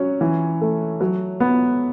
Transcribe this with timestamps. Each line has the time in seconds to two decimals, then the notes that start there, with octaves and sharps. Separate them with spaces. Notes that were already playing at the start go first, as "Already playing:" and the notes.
Already playing: F#3 C#4
0.21 E3
0.61 A3
1.01 F#3
1.40 B3